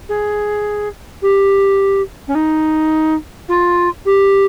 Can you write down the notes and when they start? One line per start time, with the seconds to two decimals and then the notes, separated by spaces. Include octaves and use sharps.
0.09 G#4
1.22 G4
2.27 C#4
2.35 D#4
3.48 F4
4.05 G4